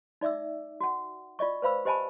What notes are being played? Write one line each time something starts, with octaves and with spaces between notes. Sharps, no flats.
D#4 D5 E5 D6 E6
F#4 F#5
F4 D5 D#5 C#6
B4 C5 F5 B5 E6
G4 C5 D#5 G#5 A5 B5